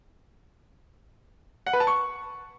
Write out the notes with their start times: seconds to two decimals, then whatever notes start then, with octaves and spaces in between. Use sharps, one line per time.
1.67 F#5
1.73 B4
1.80 A5
1.87 C#6